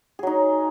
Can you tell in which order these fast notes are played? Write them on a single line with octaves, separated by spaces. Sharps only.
G#4 F#3 D#4